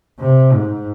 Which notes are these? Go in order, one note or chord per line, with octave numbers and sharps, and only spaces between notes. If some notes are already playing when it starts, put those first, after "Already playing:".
C3
G#2